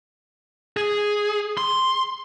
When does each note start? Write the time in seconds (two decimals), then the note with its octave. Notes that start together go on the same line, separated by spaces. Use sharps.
0.77 G#4
1.58 C6